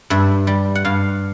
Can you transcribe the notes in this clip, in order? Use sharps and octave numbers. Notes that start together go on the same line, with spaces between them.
G2 E5
G3
F#5
G2 F5